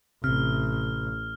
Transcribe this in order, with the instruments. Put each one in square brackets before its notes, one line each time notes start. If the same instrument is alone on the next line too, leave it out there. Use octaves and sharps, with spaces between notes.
[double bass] A1 [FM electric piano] C3 [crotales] F6